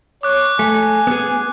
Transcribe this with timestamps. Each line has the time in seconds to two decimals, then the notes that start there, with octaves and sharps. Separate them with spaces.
0.23 C#5 D6 F#6
0.59 A3 G#5
1.07 B3 G#4